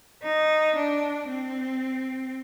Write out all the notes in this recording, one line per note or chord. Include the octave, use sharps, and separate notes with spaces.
D#4
D4
C4